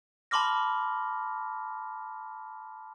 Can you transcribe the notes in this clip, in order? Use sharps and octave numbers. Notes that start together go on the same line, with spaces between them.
A5 B5 C6 D6 F6 A#6